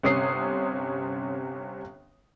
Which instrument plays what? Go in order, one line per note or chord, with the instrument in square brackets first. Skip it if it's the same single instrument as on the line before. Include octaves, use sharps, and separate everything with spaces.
[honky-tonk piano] G1 C3 C#4 D#6 C7